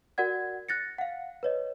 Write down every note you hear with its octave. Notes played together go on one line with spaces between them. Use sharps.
F#4 A#4 D5 F#5 G#6
F#6 A6 A#6 C#7
F5 F#5
B4 C#5 D#5